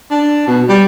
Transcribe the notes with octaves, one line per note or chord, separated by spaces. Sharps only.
D4
B2
G3